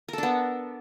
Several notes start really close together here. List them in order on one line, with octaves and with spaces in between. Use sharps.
A#4 A4 D4 B3